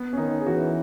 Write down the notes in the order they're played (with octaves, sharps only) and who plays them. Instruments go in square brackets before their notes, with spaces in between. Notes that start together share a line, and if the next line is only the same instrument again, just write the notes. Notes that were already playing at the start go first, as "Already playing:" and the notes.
Already playing: [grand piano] B3
C#4
[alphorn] D#3 [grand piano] D#4
[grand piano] G#4
[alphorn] E3 [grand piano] F#4